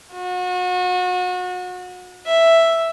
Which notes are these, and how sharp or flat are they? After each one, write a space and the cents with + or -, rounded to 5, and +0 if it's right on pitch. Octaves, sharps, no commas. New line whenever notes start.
F#4 -35
E5 +0